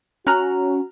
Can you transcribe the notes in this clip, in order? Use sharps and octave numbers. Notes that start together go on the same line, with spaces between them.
C#4 F#4 A#5 F6 F#6